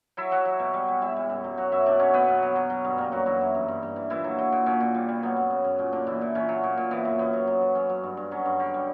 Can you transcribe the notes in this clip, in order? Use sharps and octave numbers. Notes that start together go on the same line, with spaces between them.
F#3 E4 E5
F#3 F#4 F#5
F#3
B2
G3
G3
G3 E4 E5
G3
F#2
F#3
F#3 F#4 F#5
F#2 E4 E5
B2 D4 D5
F#3 C#4 C#5
B2 B3 B4
B2
F#3
F#3
F#3
G2
G3 A#3 A#4
F#2 F#3 F#4
F#2 E3 E4
F#2
G2
G2
G2
E3
A#2 E3 E4
F#3
F#3
A#2
A#2 C#4
A#2
G3
G3
F#3 B3
F#2
C#3
F#2
A#2 C#4
A#2 D3 D4
A#2 E3 E4
A#2
A#2 C#4
F#3
A#2
A#2
E3 B3
F#2
F#2 B3
F#2
F#3
F#3
F#3 C#4
F#3
G2
G2
F#3 C#4
G2
D3
G3